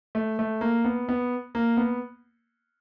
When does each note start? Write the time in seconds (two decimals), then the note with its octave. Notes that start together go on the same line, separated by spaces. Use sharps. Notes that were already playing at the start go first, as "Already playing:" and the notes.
0.15 A3
0.39 A3
0.61 A#3
0.85 B3
1.09 B3
1.55 A#3
1.77 B3